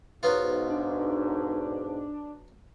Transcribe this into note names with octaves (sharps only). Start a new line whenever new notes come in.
B1 G#2 F#3 B3 F4
D4